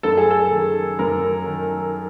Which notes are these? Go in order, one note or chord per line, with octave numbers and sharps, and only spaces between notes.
F#2 A4
G#4
A4
D#3
F#2 A#4
D#3